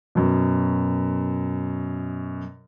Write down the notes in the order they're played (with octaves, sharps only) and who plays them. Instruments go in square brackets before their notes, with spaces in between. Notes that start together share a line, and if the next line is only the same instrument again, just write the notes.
[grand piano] F#2 B2